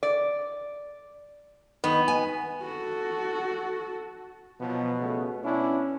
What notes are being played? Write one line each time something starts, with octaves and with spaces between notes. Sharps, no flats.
D5
D#3 B3
G#5
F#4 A4
B2 F3 F#3 B3
C#3 A3 B3
B3 C#4 D4 E4